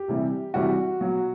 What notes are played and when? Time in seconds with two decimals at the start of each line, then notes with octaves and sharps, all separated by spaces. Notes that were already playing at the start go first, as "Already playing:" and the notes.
Already playing: G4
0.08 C3 E3 G3
0.54 C3 E3 G3 F#4
1.01 B2 F#3